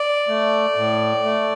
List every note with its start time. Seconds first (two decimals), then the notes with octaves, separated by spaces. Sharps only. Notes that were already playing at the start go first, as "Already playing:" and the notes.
Already playing: D5
0.28 A3
0.75 A2
1.23 A3